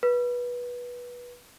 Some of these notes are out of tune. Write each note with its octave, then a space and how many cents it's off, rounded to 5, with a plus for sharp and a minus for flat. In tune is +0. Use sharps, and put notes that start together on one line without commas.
B4 -20